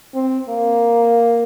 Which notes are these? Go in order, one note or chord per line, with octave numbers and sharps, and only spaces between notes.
C4
A#3